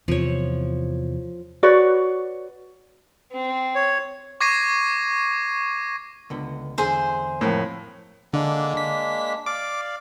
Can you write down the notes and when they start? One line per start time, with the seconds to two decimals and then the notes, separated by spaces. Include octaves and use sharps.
0.08 E2 C3 F3 C#5
1.63 F#4 B4 C#5 D5
3.32 C4
3.75 C#5
4.41 C#6 D6 G#6 A#6 C7 D#7
6.30 C#2 D3 B3
6.78 E2 D3 G#4 C5 E5
7.41 F2 A2 A#4 C5
8.33 D3 G#3 A#3 D4
8.77 B6
9.46 D5 F5 D6